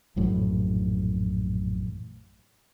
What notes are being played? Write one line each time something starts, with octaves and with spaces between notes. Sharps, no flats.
A#1 F#2 A2 E3